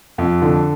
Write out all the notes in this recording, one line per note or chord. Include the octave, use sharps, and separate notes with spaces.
F2
D3